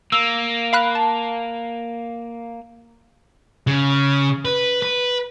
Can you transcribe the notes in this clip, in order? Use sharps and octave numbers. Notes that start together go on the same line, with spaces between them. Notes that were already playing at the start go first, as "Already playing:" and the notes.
A#3 E6
F5 B5 F#6
A5
C#3
B4
B4